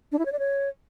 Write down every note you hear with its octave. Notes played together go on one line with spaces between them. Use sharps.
D4
E4
C#5
D5
C#5